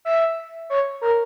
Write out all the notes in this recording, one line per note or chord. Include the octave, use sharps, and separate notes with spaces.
E5
C#5
A#4